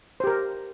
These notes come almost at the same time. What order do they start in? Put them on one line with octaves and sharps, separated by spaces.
C5 G4 A#4